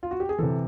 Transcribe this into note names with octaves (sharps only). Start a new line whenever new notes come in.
F4
F#4
G4
G#4
C3 E3 A4